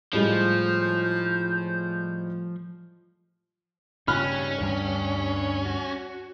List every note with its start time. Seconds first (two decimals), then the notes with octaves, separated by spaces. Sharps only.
0.13 A2 F3 G3 G#3 G6
4.08 G2 C#3 C#4 D#4 G4 B5 F6 F#6
4.60 D2 G2 G3 D4 G4
5.65 F#4